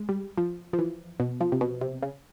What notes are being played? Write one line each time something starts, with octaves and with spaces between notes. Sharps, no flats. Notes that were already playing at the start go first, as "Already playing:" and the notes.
Already playing: G#3
G3
F3
F3
E3
B2
F3
C3
B2
C3
C#3